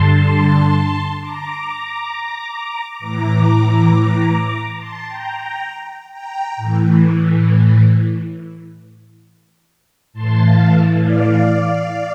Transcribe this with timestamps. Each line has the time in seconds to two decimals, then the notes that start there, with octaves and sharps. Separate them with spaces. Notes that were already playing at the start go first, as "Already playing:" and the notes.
Already playing: G2 D3 A5 C6
1.20 A#5 D6
2.99 A2 E3 A#5 D6
4.77 A5 C6
5.08 G5 A#5
5.37 G5 A#5
6.11 G5 A#5
6.57 A2 E3
10.13 A2 E3 A5 C6
10.44 F5 A5
11.03 D5 F5